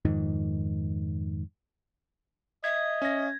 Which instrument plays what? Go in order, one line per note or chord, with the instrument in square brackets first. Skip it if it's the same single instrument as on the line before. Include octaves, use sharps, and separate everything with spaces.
[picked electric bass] F2 G#2 D#3
[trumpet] D#5 [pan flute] E5 [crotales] G#6
[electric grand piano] C#4 A#6